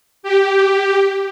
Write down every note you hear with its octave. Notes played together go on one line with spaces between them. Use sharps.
G4